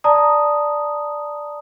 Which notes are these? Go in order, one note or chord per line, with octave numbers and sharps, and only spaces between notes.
D5 A5 A#5 D#6